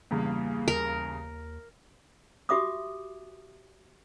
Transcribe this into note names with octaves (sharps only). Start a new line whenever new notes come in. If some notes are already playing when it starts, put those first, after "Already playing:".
E2 G2 C#3 A#3
D#2 A#4
F#4 G4 E5 D6 D#6